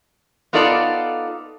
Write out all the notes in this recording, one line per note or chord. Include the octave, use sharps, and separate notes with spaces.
B3 D#4 F4 A4 D5